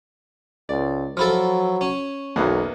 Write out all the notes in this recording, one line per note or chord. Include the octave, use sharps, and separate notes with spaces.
C#2 D5
F3 F#3 E4 A4 F6
C#4
B1 E2 A#3 B3